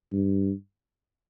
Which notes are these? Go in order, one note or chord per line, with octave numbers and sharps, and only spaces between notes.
G2